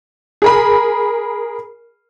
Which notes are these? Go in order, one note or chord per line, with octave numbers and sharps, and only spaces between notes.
G#4 A#4 B5